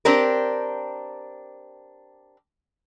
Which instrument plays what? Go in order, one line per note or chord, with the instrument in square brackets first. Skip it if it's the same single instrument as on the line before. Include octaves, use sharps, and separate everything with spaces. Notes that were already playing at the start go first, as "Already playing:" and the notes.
[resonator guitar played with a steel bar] C4 D4 G4 A#4